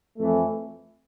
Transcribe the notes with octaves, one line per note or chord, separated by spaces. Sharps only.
F2 E3 A3